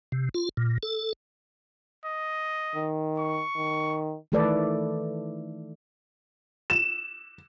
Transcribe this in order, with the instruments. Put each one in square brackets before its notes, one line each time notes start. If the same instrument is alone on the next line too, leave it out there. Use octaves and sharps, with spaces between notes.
[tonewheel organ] C3
F4
A#2
A4
[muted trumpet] D#5
[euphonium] D#3
[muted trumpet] C#6
[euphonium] D#3
[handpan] D#3 E3 A3 A4 B4 D5
[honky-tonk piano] E7